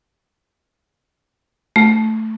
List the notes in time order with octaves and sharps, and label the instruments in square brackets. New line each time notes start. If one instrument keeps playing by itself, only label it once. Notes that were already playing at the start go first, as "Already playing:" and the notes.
[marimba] A3